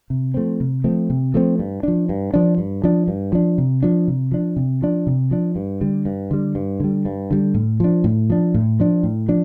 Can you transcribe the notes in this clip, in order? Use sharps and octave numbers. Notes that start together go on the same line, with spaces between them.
C3
F3 A3 C4
C3
F3 A3 C4
C3
F3 A3 C4
G2
F3 D4
G2
F3 D4
G2
F3 D4
G2
F3 D4
C3
F3 D4
C3
F3 D4
C3
F3 D4
C3
F3 D4
G2
D3 G3
G2
D3 G3
G2
D3 G3
G2
D3 G3
A2
F3 D4
A2
F3 D4
A2
F3 D4
A2
F3 D4